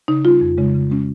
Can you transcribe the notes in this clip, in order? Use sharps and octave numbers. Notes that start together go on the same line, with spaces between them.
C#3 D#4
G3 C#4 F4
F2
C#3 G#3
C#3
G#3 C#4